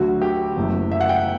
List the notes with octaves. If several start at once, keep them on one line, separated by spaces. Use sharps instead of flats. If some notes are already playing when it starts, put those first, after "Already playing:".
Already playing: D2 D3 F#3 A3 F#4
G4
F#1 F#2 E3 A3
E5
F#5
G5